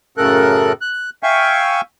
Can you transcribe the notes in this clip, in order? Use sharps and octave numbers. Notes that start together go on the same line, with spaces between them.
F#2 A2 C#3 A4 A#4 F#6
F#6
E5 F5 G5 G#5 C#6